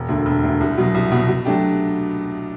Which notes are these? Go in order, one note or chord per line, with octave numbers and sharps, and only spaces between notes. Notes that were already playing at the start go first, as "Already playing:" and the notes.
Already playing: E1
D2 D3
E1
D2 D3
C2
B2 F#3
C2
B2 F#3
B2
F#3 A3 D4 G4